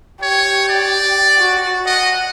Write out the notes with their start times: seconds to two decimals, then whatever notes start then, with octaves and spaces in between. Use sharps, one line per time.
0.22 G4 C#5
0.69 D5
1.39 F#4
1.86 D#5 F#5